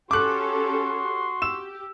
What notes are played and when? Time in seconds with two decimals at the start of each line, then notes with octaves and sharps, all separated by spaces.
0.11 C#4 F#4 G4 A4 C6 D6 F#6
1.42 G4 E6 E7